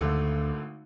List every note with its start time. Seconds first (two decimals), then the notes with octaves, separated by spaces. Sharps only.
0.01 G#1 D2 D3 A3